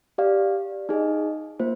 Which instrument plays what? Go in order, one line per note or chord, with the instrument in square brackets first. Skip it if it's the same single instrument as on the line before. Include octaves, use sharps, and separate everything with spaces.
[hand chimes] G4 D5 F5
D#4 G#4 D#5
A#3 F4 C5